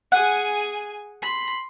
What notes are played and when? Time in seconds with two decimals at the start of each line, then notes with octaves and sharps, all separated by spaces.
0.12 G#4 F#5 G#5
1.22 B5 C6